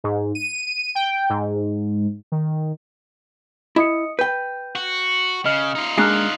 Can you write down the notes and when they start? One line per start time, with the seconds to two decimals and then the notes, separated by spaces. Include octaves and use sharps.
0.04 G#2
0.35 D#7
0.95 G5
1.30 G#2
2.32 D#3
3.76 E4 D#5 D#6 C#7
4.19 B4 G5 G6
4.75 F#4
5.45 C#3 D#5 F6
5.75 D#4 F4
5.98 G#3 A#3 D4 F6 F#6 C7